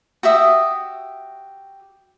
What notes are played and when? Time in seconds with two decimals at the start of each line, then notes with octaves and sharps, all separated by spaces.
0.23 F#4 G4 E5 D#6